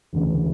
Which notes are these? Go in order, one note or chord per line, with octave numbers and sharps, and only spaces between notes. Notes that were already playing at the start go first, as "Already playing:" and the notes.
E1 D2 C#3 E3